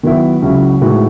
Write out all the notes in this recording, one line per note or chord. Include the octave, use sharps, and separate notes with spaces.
D#3 F#3 B3 E4
C#2 C#3 F#3 C#4 E4
A2 E3 G#3 D#4 F#4